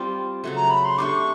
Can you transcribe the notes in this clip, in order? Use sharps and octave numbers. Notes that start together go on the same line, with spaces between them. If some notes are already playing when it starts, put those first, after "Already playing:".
Already playing: G3 C4 F4
C#3 F#3 A3
A#5
B5
C6
A3 D4 G4 C#6 D6